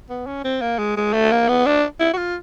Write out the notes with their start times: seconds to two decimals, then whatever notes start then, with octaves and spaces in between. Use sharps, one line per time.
0.10 B3
0.27 C#4
0.44 C4
0.61 A#3
0.78 G#3
0.97 G#3
1.13 A3
1.32 A#3
1.49 B3
1.66 D4
2.00 E4
2.13 F#4
2.17 F4